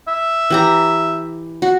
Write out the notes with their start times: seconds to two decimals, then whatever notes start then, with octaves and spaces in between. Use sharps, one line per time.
0.08 E5
0.50 E3 G4 A#5
1.62 F#4